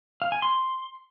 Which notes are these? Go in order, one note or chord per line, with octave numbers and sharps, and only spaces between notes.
F5
G#5
C6